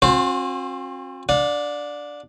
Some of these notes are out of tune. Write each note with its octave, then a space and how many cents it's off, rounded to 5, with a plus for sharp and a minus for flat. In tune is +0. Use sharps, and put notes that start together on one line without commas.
C4 +45 F#4 -40 C5 +0
D4 +0 F5 +45